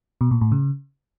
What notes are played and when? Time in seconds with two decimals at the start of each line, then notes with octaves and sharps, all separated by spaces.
0.21 B2
0.31 A#2
0.41 A2
0.52 C#3